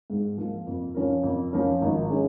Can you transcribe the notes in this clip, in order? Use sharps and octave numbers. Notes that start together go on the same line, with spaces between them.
G#2
F3 A#3
F2
F3 C#4 A#4
F2
F3 C#4 A#4
G#1
G#3 C#4